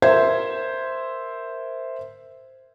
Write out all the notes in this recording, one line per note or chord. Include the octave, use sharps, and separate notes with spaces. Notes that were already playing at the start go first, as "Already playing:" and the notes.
A#4 C5 E5 G#6